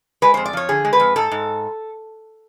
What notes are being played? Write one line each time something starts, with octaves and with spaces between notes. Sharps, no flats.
G#3 B4
F2 C5
D5
F3 C#5
D3 G#4
G#3
B4
F2
G#2 A4
G#2